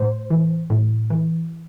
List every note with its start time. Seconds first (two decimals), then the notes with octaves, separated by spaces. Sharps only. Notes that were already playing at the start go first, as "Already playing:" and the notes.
Already playing: A2 C5
0.30 E3
0.70 A2
1.10 E3